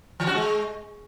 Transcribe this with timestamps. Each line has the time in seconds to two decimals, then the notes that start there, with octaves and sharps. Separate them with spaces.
0.20 E3
0.27 F#4
0.35 G#3